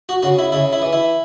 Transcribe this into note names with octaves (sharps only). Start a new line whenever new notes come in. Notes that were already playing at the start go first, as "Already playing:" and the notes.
F#4
C#3 F#4
E4
C#3 E4
E4
E3
E4